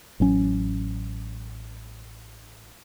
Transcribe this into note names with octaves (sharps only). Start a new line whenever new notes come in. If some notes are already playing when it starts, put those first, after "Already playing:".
A1 F#3 C#4